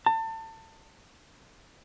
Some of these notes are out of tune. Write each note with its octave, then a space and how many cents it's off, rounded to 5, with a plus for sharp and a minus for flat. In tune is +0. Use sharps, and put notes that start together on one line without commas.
A5 +30